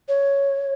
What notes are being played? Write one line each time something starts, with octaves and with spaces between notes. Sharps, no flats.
C#5